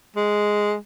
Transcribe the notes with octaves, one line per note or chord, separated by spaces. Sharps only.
G#3